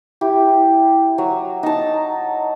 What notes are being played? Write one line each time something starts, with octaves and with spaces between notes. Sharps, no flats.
E4 G4
F#3
D#4 A5